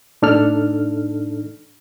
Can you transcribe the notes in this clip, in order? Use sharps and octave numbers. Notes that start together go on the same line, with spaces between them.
A2 D4 D#4 A4 F6